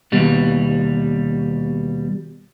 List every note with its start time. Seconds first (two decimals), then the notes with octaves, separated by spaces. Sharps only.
0.12 D#2 B2 G3